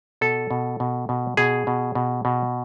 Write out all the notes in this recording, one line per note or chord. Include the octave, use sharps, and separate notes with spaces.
B2 A4
B2
B2
B2
B2 G#4
B2
B2
B2